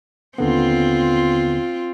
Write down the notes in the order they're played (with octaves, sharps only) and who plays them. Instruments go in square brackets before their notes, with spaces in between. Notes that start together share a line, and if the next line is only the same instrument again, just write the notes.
[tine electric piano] D#2 D3 B3 [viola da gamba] C4 F4